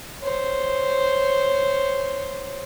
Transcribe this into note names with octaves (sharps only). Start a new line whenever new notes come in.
C5 C#5